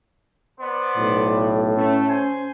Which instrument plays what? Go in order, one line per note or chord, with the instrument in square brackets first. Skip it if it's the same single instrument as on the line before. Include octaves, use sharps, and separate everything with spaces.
[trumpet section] B3 C5 D5
[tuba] B1 [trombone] A2
[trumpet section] A3 [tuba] C#4
[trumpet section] C5 G#5